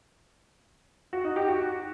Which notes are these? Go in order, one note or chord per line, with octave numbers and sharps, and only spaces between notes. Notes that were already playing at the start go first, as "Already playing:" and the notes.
F#4
D#4
G4
F#4